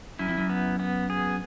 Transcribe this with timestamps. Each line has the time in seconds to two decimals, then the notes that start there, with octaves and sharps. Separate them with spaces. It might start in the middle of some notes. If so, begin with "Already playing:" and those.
0.19 F#2 E4
0.29 F2
0.38 F#2
0.50 B3
0.79 B3
1.10 G#4